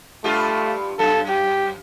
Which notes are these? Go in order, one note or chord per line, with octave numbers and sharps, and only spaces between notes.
G2 A3 F4 G4
F#2 A4
G4